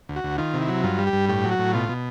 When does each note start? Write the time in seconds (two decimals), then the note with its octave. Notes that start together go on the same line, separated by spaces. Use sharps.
0.09 D2
0.16 F#4
0.24 D2
0.38 D#3 F4
0.54 C3
0.61 E4
0.68 F#3
0.83 G2 F4
0.99 G3
1.07 G4
1.13 G2
1.29 A2 G4
1.44 F#3
1.51 F#4
1.59 A2
1.74 B2 F4
1.89 B2